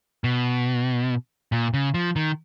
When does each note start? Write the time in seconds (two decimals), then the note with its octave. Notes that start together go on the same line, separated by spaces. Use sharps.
0.24 B2
1.52 A#2
1.74 C#3
1.94 F3
2.16 D#3